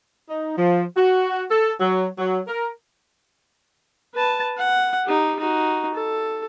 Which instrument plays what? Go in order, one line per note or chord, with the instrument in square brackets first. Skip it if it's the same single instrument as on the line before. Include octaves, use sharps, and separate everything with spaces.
[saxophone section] D#4
F3
F#4
A4
F#3
F#3
A#4
[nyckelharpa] B4 A5
F#5
D#4 G4
D#4 F#4
A4